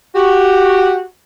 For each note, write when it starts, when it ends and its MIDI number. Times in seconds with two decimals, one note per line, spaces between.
0.14 1.01 66
0.14 1.01 67